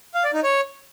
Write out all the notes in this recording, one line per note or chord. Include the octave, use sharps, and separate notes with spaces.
F5
D5
D#4
C#5